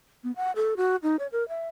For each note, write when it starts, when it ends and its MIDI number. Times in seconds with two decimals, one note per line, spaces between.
0.24 0.31 59
0.36 0.52 78
0.56 0.74 69
0.77 0.96 66
1.03 1.16 63
1.19 1.27 73
1.32 1.47 70
1.49 1.69 76